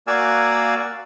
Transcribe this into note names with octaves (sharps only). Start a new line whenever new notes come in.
A#3 F#4 D5 F5 G#5 E6